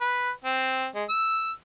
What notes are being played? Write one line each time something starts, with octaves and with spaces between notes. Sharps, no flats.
B4
C4
G#3
E6